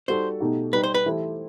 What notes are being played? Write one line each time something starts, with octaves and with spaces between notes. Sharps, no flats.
G3 D#4 F#4 A4 C5
B2 A3 D#4 G4
G3 D#4 G4 B4
C5
B4
E3 A3 E4 G4 C5